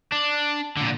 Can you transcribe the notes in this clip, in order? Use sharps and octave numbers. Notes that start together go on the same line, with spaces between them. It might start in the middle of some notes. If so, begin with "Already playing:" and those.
D4
A#2 D3